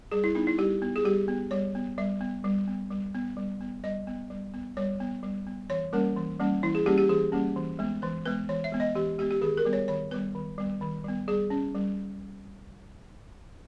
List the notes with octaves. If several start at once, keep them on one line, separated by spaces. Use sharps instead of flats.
G3 G#4
E4
B3 D#4
E4
G3 G4
B3
G#4
G3 G4
B3
G3 C#5
B3
G3 E5
B3
G3
B3
G3
B3
G3
B3
G3 D#5
B3
G3
B3
G3 C#5
B3
G3
B3
E3 C#5
G3 A#3 C#4 A#4
E3
G3 A#3 C#4
E3 E4
G#4
G3 A#3 C#4 G4
G4
E3 G#4
G3 A#3 C#4
E3
G#3 B3
E3 B4
G#3 B3 B4
E3 C#5
E5
G#3 B3
D#5
E3 G4
G#3 B3 G4
G4
D#3 G#4
A#4
G3 B3
C#5
D#3 C#5
G3 B3 B4
D#3
G3 B3
D#3
G3 B3
G3 G#4
C#4
G3